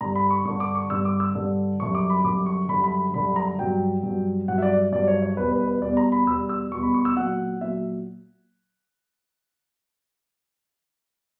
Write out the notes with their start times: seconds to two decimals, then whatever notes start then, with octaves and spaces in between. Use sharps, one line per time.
0.01 G2 D3 G3 A#5
0.15 B5
0.31 C#6
0.45 G2 D3 G3 C#6
0.60 D6
0.75 C#6
0.90 G2 D3 G3 E6
1.05 D6
1.20 E6
1.35 G2 D3 G3
1.80 F#2 D3 G3 C#6
1.95 D6
2.10 B5
2.24 F#2 D3 G3 D6
2.46 C#6
2.69 F#2 D3 G3 B5
2.84 B5
3.14 F#2 D3 G3 B5
3.36 A#5
3.59 G2 F#3 G5
4.03 G2 F#3
4.48 G2 F#3 F#5
4.58 E5
4.62 D5
4.92 G2 F#3 D5
5.08 C#5
5.22 C#5
5.37 E2 B2 G3 B4
5.52 B4
5.67 B4
5.82 E2 B2 G3 D5
5.97 A#5
6.12 B5
6.27 E2 B2 G3 E6
6.49 E6
6.72 E2 B2 G3 C#6
6.83 B5
6.94 C#6
7.05 E6
7.17 A#2 F#3 F#5
7.61 A#2 F#3 E5